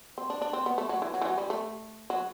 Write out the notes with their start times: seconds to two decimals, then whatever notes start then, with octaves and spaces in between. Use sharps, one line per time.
0.18 C4
0.30 D4
0.42 D4
0.53 C4
0.66 B3
0.78 A3
0.89 F#3
1.02 E3
1.14 F#3
1.22 E3
1.25 F#3
1.38 G3
1.50 A3
2.10 F#3